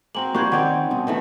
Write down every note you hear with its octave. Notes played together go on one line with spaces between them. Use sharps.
A#3 C4 F#4 G#5 F#7
G3 A#3 F4 F#4 C#6 G6 G#6
D#3 C4 C#4 D5 F#5 C6
G2 B2
D#3 E3 A3